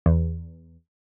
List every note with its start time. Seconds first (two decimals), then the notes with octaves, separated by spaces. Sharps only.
0.06 E2